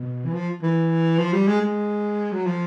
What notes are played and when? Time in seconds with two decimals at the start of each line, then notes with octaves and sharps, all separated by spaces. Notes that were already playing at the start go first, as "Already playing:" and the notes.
Already playing: B2
0.25 E3
0.34 F3
0.62 E3
1.19 F3
1.33 G3
1.48 G#3
1.61 G#3
2.32 F#3
2.46 F3